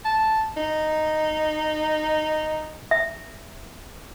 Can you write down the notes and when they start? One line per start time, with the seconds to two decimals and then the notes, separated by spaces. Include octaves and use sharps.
0.05 A5
0.57 D#4
2.91 E5